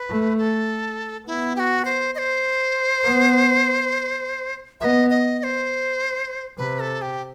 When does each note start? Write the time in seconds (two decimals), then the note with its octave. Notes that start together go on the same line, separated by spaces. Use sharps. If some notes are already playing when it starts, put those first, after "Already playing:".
Already playing: B4
0.09 A3
0.38 A4
1.27 B3 E4
1.56 G4
1.60 F#4
1.85 C5
2.15 D#5
2.18 C5
3.04 B3
4.80 B3 D#5 E5
5.10 D#5
5.39 D#5
5.43 C5
6.57 C3 B4
6.80 A4
7.02 G4